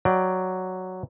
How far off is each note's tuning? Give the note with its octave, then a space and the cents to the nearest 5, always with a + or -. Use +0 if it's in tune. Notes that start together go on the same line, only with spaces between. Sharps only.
F#3 +0 D5 +10 G5 +0